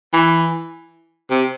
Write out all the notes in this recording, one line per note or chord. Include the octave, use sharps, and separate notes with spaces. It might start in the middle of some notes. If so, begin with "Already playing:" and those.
E3
C3